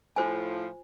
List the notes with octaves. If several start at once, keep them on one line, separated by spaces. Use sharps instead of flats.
A2 F3 F4 C5 G#5